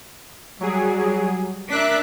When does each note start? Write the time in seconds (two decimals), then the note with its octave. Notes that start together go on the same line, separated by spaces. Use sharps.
0.61 F#3 G3 G#4
1.70 D4 A#4 E5 D6 F#6 B6